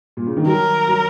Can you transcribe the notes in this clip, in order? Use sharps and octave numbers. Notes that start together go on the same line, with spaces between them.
A#2
C#3
D#3
F#3 A#4
F#3